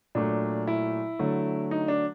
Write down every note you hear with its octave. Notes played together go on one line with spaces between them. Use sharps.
A#2 F#3 A3 D4
E4
D3 F#3 A3
D#4
D4